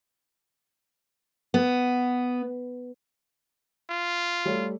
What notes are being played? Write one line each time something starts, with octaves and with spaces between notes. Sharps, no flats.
B3
F4
G3 A3 C#5